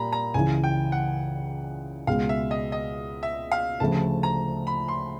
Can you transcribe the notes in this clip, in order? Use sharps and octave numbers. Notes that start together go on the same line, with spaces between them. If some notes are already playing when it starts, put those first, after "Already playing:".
Already playing: A#2 G3 A#5 B5
A#5
C#2 C#3 E3 G#5
G5
F#5
C#2 B2 G#3 F5
E5
D#5
D#5
E5
F5
D2 C#3 F3 A3 A5
A#5
B5
C6